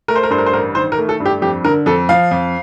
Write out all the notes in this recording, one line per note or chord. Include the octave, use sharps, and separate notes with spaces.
A3 A#4
C5
A#4
G2 C5
A#4
C5
A1 A#4
D#3 C5
A#4
A3
A4
G2
G4
F2 G4
D3 A#4
F2 A4
F3 F5
F2